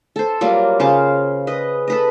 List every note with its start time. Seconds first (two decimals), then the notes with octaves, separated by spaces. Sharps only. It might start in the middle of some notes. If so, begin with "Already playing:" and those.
0.16 A4 C5
0.41 F#3 G3 A#3 F4
0.80 C#3 F4 C5 F5
1.47 B4 D#5
1.88 A4 B4 D#5